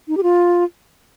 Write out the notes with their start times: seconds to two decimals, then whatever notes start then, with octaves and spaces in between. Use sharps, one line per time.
0.08 D#4
0.17 G4
0.23 F4